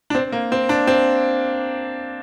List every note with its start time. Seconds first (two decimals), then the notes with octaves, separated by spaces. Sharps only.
0.10 D4
0.15 C4
0.32 A#3
0.52 C4
0.69 D4
0.87 C4